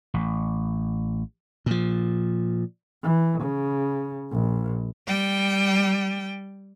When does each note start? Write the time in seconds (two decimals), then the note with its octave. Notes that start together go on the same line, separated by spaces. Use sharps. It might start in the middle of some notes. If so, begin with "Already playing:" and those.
0.14 A1
1.66 A#2 F3
3.04 E3
3.41 C#3
4.32 A#1
5.07 G3 G5